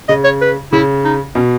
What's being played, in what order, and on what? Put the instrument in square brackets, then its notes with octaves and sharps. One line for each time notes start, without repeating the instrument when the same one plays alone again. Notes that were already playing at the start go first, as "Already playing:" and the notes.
[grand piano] C#3 [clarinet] D#5
[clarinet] C#5
B4
[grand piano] C#3 [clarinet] E4
[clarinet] D#4
[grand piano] B2 [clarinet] C#4